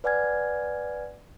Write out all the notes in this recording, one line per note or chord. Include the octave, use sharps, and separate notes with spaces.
B4 D5 F#5 G#5 F6 G#6